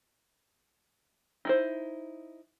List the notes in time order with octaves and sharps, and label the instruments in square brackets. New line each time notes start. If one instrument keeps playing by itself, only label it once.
[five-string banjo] D#4 E4 C5